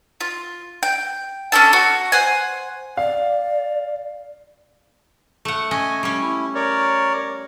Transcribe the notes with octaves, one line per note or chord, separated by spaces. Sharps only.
F4
G5
C#4 D4 A4 A5
F#4
C5 F#5 G#5
D5 F5
A3 F#5
C#4 D#5 G#5
G3 C#4
E4
A#4 C#5 D5